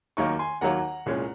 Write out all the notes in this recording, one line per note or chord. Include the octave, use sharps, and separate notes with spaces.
D#2 D#3 F#3 A#3 A#5 C#6
G#5 C6
D#2 D#3 F#3 A#3 F#5 A#5
C2 A#2 G#3 C#4